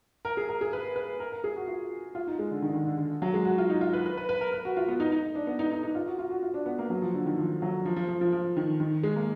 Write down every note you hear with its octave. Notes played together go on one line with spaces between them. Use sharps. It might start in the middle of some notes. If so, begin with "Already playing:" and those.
A#4
G#4
A#4
G#4
B4
B4
A#4
A#4
G#4
F#4
F4
F4
D#4
G#3
D3
D#3
D3
D#3
D3
D3
F#3
G#3
F#4
F4
D#4
F4
B4
B4
B4
B4
A#4
B4
F#4
F4
B3
D#4
D#4
D4
B3
D#4
D#4
D#4
F4
F#4
F4
F#4
F4
D4
B3
A#3
F#3
F3
D3
D#3
F3
F#3
F3
F3
F3
F3
F3
D#3
D#3
G#3
A#3